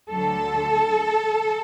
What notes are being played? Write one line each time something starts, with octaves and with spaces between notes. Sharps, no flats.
D2 D3 F#3 A4